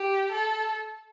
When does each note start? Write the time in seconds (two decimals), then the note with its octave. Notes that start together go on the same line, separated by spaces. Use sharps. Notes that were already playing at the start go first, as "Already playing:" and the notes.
Already playing: G4
0.32 A4